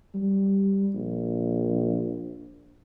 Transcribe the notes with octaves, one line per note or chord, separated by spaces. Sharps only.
G3
A#1